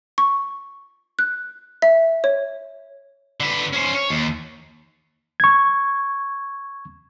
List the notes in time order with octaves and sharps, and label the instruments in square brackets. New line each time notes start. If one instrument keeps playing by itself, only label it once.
[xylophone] C#6
F#6
E5
C#5
[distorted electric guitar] D3 B4
C#4 C5
C#5
D#2
[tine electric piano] C#6 G#6